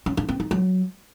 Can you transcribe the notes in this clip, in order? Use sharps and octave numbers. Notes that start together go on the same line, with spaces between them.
C#4
D4
C4
D#4
F#3